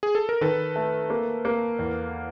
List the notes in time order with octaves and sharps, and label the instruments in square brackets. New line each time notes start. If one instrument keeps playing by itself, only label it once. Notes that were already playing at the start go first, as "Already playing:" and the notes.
[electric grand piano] G#4
A4
A#4
[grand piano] D#3 [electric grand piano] A4 B4
[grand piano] A3
A#3
A#3
E2